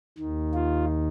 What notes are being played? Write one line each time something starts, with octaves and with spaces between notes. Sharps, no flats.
D#2 D#3
F4